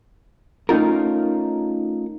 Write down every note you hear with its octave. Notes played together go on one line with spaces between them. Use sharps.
A3 C#4 D#4 F4 A#4